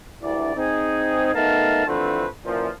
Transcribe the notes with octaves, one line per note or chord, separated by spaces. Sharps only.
D2 G2 E4 D5
C4 D#4 G#4
A3 B3 D#4 A#4 F5 A5
D3 E3 F3 A3 C4 B4
F#2 A#2 E3 F3